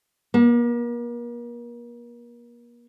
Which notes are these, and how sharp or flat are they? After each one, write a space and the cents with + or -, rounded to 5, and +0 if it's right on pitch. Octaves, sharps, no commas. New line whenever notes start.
A#3 +40